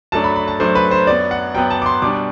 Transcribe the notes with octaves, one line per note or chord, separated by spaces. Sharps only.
F#2 F#3 A3 D4 A5
B5
B5
A5
F#2 F#3 A3 D4 C5
B4
C5
F#2 F#3 B3 D5
F#5
F#2 F#3 B3 G5
A5
D6
C6
B2 G3 D4 D6